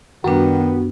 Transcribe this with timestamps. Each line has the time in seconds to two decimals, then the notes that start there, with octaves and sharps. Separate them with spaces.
0.24 F#2 D#3 G3 B3 D4 F#4